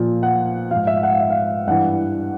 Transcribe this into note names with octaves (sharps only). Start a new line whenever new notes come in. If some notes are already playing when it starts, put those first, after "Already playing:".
Already playing: A#2 F3
F#5
G#2 F3 F5
E5
F#5
F5
E5
F5
G2 E3 F#5